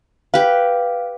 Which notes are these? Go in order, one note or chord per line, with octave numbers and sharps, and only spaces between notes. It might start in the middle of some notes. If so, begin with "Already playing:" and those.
G4 B4 F5